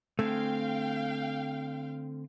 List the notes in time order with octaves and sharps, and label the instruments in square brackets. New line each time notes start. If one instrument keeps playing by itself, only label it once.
[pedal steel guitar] D3 C4 G#5 [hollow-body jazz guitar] A3 [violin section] F5 G5